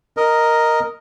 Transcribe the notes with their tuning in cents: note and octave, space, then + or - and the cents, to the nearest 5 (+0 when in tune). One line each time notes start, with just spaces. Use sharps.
A#4 +0 D#5 +0